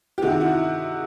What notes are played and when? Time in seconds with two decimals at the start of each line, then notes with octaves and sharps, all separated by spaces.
0.18 G4
0.22 C3 D#3 F#4 G#4
0.40 E4 F#4